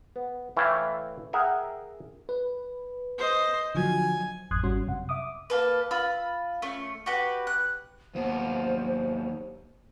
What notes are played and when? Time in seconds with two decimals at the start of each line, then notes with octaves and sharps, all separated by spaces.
0.16 B3
0.57 E3 A3 E4 C#5 F5 G5
1.33 G#4 A#4 E5 F#5 G5
2.29 B4
3.18 C5 D#5
3.75 D3 F3 F#3 G#5
4.51 G#1 F2 C6 D#6 F#6 G#6
4.63 G#1 G3 C#4 F#4 C6
4.87 F#2 C3 F#5
5.09 E5 D6 D#6
5.50 A#3 A4 B4
5.91 F4 B5 E6
6.62 A3 C#4
7.06 F#4 G4 B4
7.47 F#6
8.15 D#2 B3 C5